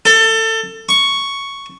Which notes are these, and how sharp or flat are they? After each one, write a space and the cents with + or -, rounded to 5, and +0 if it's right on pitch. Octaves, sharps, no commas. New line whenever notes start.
A4 +25
C#6 +5